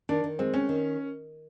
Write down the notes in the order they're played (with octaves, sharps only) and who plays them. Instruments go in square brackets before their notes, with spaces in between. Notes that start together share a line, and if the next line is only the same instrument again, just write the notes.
[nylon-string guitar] D#3 [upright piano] D4
[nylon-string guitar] D#3
[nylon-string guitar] G#3 [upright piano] C4
[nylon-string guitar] C4 [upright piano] C#4
[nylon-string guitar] D#3